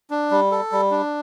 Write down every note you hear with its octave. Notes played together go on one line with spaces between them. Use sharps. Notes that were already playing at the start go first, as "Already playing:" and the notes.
D4
G3
A4
G3
D4